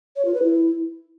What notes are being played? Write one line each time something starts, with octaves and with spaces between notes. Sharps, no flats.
C#5
F4
B4
E4